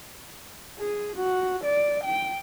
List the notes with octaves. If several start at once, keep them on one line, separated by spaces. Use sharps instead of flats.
G#4
F#4
D5
G5